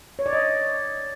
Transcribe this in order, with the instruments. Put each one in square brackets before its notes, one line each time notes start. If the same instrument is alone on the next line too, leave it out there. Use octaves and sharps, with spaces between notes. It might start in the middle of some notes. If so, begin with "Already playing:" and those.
[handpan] C#5
D5
D#5